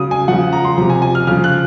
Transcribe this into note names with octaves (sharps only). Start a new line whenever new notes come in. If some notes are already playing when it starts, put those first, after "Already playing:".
Already playing: C#3 F#3 D#6
G#5
C#3 F3 F#5
A#5
C6
C3 F3 A#5
G#5
G#5
F6
C#3 F3 F6
F#6